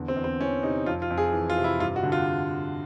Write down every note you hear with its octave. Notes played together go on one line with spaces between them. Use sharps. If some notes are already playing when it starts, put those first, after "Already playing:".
Already playing: E2 D3
C4
E2
C4
E3 C#4
C3 D#4
F2 F4
F4
F2
G#4
E3
F4
C3
E4
G2 F4
F#4
D3
F4